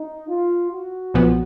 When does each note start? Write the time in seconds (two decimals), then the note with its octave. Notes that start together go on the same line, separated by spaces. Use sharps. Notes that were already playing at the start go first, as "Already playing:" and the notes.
Already playing: D#4
0.28 F4
0.71 F#4
1.14 B1 A#2 F3 B3